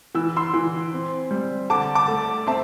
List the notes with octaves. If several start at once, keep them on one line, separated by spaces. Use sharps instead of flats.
E3 E6
C6 E6
E3
C4
G3
D3 A5 D6
A5 D6
A3
C4 E5 A5